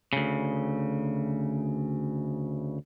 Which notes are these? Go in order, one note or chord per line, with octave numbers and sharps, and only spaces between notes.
D2 C#3